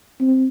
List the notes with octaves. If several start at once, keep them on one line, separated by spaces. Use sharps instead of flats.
C4